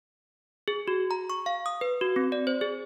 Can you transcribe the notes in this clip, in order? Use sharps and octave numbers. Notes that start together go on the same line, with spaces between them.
G#4
F#4
A#5
C#6
F5
D#6
B4
F#4
C4
D5
C5
G#4